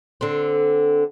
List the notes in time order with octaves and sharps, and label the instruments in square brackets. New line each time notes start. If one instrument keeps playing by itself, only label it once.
[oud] D3 C4